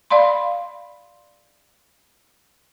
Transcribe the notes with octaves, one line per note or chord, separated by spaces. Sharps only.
D5 F5 B5 C6